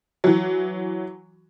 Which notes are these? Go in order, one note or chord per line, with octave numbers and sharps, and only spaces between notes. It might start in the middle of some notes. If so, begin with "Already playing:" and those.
E3 F#3